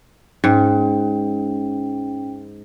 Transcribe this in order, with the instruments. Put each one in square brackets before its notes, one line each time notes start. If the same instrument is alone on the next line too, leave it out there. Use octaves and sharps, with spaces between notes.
[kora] G#2 [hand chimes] C#4 G5